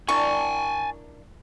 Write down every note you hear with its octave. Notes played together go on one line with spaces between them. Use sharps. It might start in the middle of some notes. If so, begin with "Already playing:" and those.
D4 E4 A#4 G#5 A5 C#6